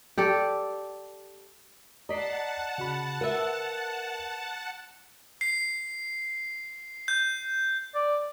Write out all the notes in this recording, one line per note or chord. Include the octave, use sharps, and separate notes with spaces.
G4 A4 D5
D5 D#5 F#5 A5 A#5 B6 C7
C#3 F#4 B5
A#4 B4 E5 F5
C7
G6
D5